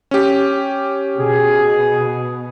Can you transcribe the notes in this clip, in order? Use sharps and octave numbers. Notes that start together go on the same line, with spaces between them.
C#4 G4
B2 G#4